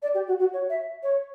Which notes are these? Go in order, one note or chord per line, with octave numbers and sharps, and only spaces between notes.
D5
G4
F#4
F#4
C#5
E5
C#5